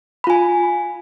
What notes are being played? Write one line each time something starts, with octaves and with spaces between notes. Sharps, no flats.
F4 G#5 B5